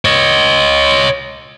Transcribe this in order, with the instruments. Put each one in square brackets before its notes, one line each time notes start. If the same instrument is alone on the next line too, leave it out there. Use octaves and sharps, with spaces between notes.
[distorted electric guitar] C#5 D#5